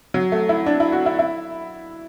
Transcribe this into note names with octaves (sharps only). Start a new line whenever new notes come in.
F#3
A3
E4
D4
E4
F#4
E4
E4